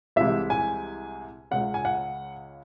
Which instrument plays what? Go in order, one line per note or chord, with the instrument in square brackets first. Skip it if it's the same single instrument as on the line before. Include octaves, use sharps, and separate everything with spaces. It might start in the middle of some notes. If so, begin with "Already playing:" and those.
[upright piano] C2 C3 E3 G#3 E5
G#5
C#2 C#3 G#3 F#5
G#5
F#5